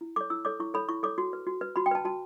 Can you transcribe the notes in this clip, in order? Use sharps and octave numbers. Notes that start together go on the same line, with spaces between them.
E4
A4 C#5 D6
E4 E6
A4 C#5 D6
E4 C#6
A4 C#5 B5
E4 C#6
A4 C#5 D6
F#4
B4
F#4
B4
F#4 B5
G5
B4 A5
F#4 A5